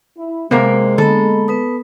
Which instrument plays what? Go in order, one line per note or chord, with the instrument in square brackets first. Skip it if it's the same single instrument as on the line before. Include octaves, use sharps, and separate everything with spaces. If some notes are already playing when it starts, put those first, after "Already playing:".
[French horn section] E4
[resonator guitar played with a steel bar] C3 A#3 A#4 [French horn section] G#3 [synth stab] B3 [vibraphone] C5
[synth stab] D3 [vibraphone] A#3 B3 B5 [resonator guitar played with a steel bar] A4
[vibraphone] B3 B4 D#6